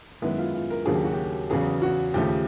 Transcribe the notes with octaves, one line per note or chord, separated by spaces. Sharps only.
F#2 D#3 G#3 B3 E4
F4
F4
A#4
D#2 C#3 F#3 A#3 D4 G#4
G4
F#4
G4
E2 C#3 F#3 B3 G#4
F#4
D#2 C#3 F3 A3 G4